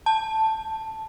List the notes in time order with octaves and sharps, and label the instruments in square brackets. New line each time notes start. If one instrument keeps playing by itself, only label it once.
[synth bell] A5